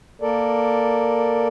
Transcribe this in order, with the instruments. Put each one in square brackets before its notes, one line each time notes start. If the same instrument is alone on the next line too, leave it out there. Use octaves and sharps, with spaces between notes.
[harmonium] A#3 A4 A#4 D5